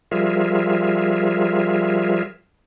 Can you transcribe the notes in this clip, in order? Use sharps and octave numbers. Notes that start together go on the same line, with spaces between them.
F3 G3 F4 G#4 A#4 E5